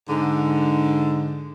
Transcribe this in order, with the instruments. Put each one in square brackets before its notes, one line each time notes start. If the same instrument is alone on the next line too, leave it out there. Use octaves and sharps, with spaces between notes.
[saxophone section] G#2 D3